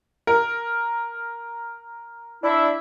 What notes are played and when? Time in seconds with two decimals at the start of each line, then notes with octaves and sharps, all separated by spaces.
0.27 A#4
2.43 D4 E4 E5